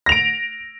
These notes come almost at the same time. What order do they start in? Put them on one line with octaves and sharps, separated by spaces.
A#6 F7 D7